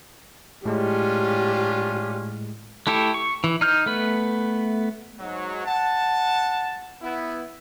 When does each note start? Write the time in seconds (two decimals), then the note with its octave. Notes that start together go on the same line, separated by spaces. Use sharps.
0.66 A2 G#3 C#4 D4 F4 G4
2.87 A3 E4 G4 A4
3.14 C#6
3.44 E3
3.61 D#4 F6 G6
3.86 A3 B3 B4
5.19 G#2 F#3
5.66 F#5 A5
7.02 B3 E4